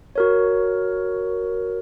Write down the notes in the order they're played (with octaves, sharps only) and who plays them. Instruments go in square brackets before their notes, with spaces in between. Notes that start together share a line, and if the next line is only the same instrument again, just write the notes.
[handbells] F#4 A#4 C#5